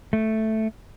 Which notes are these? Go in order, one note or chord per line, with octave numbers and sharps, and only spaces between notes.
A3